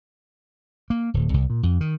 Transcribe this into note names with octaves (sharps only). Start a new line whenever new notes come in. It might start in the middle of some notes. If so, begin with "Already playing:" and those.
A#3
D1
C2
A#2
F2
D#3